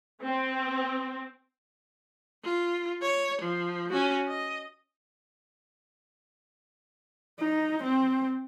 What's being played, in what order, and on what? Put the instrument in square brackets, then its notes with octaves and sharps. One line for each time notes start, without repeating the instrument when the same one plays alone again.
[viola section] C4
[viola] F4
C#5
F3
C#4 F#4
D#5
[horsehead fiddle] D#4
C4